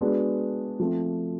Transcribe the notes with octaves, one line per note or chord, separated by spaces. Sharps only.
G#3 B3 D4 F#4
F3 A3 C4 F4